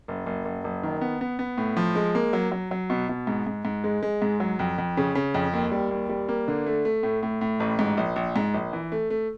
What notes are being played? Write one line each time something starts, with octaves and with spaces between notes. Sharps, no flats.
F#1
F#1
F#1
F#1
D#3
B3
B3
B3
A2
F3
G#3
A#3
F#3
F#3
F#3
B2
B2
G#2
G#2
G#2
G#3
G#3
G#2
F#3
F2
F2
C#3
C#3
F2
D#2
G3
D#2
G3
A#3
D3
A3
A3
A2
A2
A2
A1
G#2
A#1
A#1
G#2
A#1
E3
A3
A3